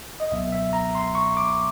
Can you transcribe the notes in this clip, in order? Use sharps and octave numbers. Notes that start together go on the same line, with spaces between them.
D#5
C#2 B2 F#3 B3 E5
E5
A#5
C6
C#6
D6